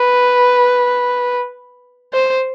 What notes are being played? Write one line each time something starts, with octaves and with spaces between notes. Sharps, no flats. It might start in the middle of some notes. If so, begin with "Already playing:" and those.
Already playing: B4
C5